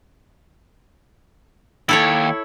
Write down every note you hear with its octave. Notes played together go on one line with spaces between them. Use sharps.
D#2 E4 A4 C#5